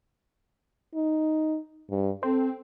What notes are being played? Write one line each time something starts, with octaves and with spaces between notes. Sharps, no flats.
D#4
G2
C4 A4